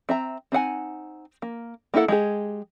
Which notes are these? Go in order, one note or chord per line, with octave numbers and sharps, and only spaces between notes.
C4 E5 A#5
C4 D#4 F#5 G#5
A#3
A#3 D#4 E4 A4 F#5
G#3 G4 G#4